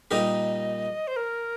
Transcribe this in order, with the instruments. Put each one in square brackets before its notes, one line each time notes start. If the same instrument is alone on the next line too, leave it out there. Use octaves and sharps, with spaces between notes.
[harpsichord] A#2 G3 D#4 G4 A#4 [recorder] D#5
[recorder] C5
A#4